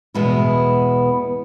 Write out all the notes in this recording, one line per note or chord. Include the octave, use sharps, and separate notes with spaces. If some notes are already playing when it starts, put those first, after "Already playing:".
E2 B2 G#3 B3 E4